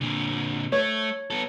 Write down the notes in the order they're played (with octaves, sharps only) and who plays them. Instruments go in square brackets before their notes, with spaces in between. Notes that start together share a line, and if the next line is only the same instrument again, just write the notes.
[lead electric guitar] A#2 D3
[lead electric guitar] A3 [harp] C#5
[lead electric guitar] B3 A4